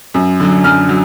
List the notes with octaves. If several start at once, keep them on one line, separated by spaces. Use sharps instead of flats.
F#2
D3 F#3
F#2 F6
F#3